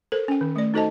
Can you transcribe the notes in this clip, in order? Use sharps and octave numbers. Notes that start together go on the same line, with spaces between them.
A4 A#4 C5
C#4 G5
D#3
A3 D5
D#4 F#4 A4 C5 D#5 A5